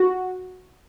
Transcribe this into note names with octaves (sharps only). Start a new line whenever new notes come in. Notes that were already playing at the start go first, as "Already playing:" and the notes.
Already playing: F#4